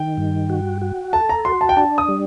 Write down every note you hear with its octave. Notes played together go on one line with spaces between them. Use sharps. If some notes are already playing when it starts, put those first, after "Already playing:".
Already playing: D#3 G5
G2
F#4
F#4
A4 A5
A#5
F#4 C6
A5
G5
D4 A5
D#6
G3